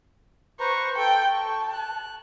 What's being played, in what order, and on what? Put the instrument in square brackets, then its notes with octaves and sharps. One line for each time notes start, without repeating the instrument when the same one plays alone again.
[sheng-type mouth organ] B4 C5 A#5 [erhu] C#6
[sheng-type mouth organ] A4 [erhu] G5
[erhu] A5 [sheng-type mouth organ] C#6
[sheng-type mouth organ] F#6